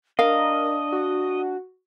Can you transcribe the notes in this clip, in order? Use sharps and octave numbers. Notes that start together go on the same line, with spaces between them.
D4 A#4 D#5 F5
F#4